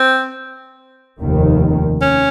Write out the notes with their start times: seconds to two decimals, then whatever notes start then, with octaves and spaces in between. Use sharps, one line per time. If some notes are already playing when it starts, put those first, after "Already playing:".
Already playing: C4
1.20 F1 D#2 D#3
2.01 C#4